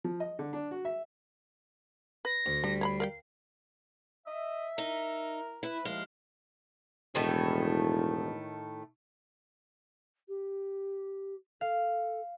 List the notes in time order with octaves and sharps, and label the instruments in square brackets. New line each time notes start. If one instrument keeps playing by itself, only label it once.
[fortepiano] F3
D#5
D3
D4
F#4
E5
[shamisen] B4 [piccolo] A#6
[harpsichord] D2
[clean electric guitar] G3 [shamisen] D4
[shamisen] C#5 A#5 B5 [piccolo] C7
[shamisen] A#4 F5 G5
[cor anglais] D#5 [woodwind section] E5
[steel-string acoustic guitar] D#4 [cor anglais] A#4
[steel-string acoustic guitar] E4 [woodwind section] B4
[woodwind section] D#2 F3 F5 [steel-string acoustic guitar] G#3
[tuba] E1 [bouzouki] A2 D#3 A3
[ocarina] G4
[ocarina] A4 [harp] F5